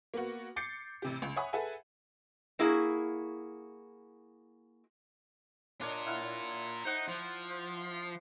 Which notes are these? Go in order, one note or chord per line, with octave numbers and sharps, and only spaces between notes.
A#3 B3 F#4
D6 G6 A6 C7 C#7
A1 C3 G4
C#2
C#5 E5 F#5 G#5 B5 D#6
G#4 A4 B4 E5 F#5 G#5
A#3 E4 F#4 G#4
D4 F4 A#4 C#5 D#5
E4 F5 F#5
D#4 C5 F#5
F3